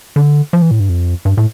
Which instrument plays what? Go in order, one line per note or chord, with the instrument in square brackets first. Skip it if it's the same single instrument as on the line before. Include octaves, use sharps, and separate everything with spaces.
[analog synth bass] D3
F3
E3
A2
G2
F2
G2
A2